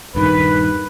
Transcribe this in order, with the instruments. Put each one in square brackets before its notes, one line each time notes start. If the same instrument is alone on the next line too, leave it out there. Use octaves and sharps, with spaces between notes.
[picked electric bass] D#1 G2 D#3 [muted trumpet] B4